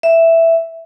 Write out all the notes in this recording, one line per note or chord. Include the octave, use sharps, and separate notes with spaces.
E5